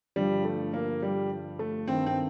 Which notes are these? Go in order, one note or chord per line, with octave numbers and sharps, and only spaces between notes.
G2 D3 F3 G3
A3
A#3
G3
A3
G2 D#3 C4
C4